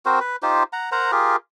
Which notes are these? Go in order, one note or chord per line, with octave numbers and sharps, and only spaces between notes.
C4 F#4 A#4 C5
B4
D#4 F4 G4 C5
F#5 A#5
A#4 C5 F#5 A#5
F4 G4 G#4 A#4